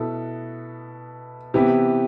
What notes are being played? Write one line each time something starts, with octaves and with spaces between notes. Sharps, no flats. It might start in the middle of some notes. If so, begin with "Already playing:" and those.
Already playing: B2 B3 E4 A4
C3 E3 B3 E4 G4